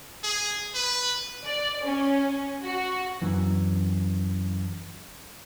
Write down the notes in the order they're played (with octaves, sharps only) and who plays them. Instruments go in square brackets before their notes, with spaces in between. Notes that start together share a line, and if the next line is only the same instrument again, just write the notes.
[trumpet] G#4
B4
[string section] D5
C#4
F#4
[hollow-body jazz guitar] F#2 E3